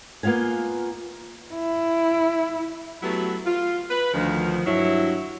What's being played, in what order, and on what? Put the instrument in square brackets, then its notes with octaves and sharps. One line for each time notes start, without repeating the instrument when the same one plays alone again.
[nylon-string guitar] A#3 B3 F4 F5 G#5
[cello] E4
[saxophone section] F#3 A3 B3 E4 F#4 G4
F4
B4
D2 D#3 F3
G2 F#3 E4